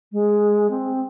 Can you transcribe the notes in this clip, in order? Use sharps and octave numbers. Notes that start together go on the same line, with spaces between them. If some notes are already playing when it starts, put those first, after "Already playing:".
G#3
C4